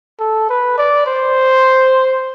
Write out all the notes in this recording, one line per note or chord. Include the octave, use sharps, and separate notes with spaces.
A4
B4
D5
C5